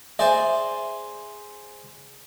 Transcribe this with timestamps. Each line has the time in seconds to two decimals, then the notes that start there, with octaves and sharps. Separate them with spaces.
0.19 G#4 C5 D5 E5